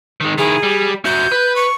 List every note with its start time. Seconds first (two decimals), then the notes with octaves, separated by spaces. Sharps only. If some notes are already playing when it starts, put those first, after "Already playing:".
0.21 D#3 G#3
0.38 D#3 E4 G#4
0.63 G3
1.05 F#4 E5 G6
1.32 B4
1.56 C#6